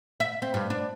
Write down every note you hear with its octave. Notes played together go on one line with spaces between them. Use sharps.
E5
C4
G2
D4